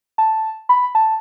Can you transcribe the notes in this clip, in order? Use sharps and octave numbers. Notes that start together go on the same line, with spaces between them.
A5
B5
A5